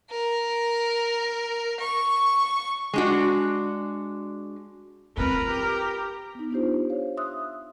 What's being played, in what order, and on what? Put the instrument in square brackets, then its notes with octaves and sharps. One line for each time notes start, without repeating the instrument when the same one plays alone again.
[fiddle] A#4
C#6
[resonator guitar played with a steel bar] G#3 D4 F#4
[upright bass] C4 F4 [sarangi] A#4 [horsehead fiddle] B4
[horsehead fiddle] G4
[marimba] B3 D#4
B3 D4 D#4 F4 G4 C5
C5 C#5 F5
E5 C6 D#6 E6 F#6